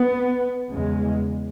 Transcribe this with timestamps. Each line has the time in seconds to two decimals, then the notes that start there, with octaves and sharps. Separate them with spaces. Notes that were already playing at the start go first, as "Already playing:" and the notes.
Already playing: B3
0.71 E2 C#3 G#3